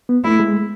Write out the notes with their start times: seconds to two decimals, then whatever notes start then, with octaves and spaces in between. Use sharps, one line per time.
0.09 B3
0.24 A3 E4
0.40 G#3